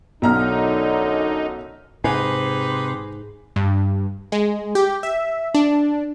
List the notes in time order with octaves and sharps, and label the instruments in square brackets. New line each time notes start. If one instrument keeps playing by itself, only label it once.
[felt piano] B1 A#5 F6 [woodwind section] F#2 D3 [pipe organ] D#4
[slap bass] G#2 [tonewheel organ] C3 C6 [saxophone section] D#4 G4 B4 [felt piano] G#5
[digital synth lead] G2
G#3
G4
E5
D4